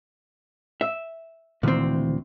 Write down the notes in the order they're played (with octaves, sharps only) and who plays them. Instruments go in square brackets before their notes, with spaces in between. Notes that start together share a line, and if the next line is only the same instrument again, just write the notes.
[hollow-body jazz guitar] E5
[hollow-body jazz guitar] D2 C4 [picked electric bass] A#2 D#3 E3